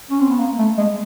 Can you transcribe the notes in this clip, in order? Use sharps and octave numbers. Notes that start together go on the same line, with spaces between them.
C#4
C4
B3
A#3
A3
G#3